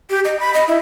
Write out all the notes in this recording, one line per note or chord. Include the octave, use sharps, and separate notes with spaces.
G4
D#5
B5
D#5
E4